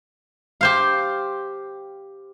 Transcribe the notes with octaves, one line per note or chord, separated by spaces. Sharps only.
G4 C5 F5